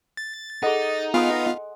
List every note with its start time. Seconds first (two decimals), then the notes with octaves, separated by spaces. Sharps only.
0.17 A6
0.63 D#4 G#4 A4 D#5 F#5
1.14 B3 F4 F5 G#5 C6 D#6